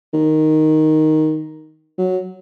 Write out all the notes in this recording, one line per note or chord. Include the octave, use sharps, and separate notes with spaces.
D#3
F#3